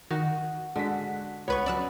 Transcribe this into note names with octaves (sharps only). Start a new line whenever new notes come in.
D#3 F#4
D3 G#3 F#4 B6
C#2 B3 B4 C#5 C#6
F#3 C#4 D5 E6 F#6